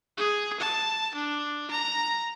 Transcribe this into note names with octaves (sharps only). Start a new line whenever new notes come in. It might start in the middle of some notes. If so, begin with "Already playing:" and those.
G#4
A5
D4
A#5